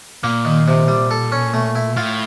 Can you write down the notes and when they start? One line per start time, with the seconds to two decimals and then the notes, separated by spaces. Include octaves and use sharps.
0.23 A#2 A#3
0.45 D#3
0.68 C3
0.88 G3
1.11 A4
1.32 C#4
1.54 A3
1.75 E4
1.96 A2 F4